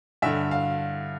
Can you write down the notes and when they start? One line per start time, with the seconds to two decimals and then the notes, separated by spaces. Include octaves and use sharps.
0.22 G2 D3 E5
0.51 F5